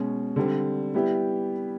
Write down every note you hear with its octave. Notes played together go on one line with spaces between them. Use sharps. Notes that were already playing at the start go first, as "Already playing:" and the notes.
Already playing: B2 G#3 C#4
D3 G3 C4
G3 B3 E4 G4